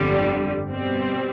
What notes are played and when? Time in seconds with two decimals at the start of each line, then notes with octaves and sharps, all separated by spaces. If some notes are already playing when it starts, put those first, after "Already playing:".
Already playing: G1 F2 D3 G3
0.69 B2 G3 C4